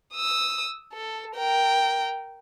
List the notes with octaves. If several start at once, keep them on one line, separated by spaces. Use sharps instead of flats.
D#6 E6
A4
A#4 G5